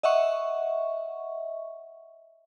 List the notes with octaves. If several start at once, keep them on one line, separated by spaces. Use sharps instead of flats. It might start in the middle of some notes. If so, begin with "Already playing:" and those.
D#5 E5 F#5 C#6